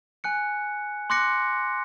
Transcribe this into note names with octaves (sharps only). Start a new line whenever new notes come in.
G#5 F#6 C#7
C6 D6 F#6 A#6 C#7